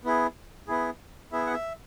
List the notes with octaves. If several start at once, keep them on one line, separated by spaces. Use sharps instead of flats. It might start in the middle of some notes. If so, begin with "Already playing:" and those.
B3 E4 G#4
B3 E4 G#4
B3 E4 G#4 E5
F#5
E5